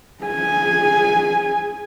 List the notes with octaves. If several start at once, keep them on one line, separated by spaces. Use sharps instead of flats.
G#4 G#5